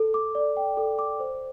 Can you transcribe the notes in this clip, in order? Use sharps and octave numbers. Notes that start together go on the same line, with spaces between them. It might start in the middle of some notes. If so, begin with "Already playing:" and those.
Already playing: A4
D6
D5
G5
A4
D6
C5